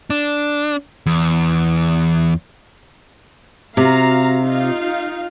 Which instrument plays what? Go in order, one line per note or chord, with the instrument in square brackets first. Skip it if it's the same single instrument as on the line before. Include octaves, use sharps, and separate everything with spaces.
[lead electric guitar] D4
E2
[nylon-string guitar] C3 [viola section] F#4 F5 A#5
[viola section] D#4 F4 F5